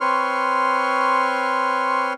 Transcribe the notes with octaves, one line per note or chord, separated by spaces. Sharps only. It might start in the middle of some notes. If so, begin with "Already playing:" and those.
C4 B4 C#5 C6 C#6 F6